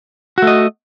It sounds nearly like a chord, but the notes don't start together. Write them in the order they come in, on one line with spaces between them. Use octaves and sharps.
F#4 A3 D#5